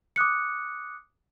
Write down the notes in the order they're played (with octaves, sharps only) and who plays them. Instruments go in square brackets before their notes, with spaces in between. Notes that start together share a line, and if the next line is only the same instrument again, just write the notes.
[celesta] D6 D#6 F#6 C#7